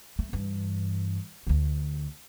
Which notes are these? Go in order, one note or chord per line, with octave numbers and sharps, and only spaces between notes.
A3
G2 E3
D2 D3